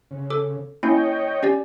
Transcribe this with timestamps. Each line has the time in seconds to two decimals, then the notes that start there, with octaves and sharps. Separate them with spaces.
0.11 C#3
0.30 A4 D6
0.83 A#3 C#4 E4 C#5 D#5 G5
1.43 C#4 G4 D5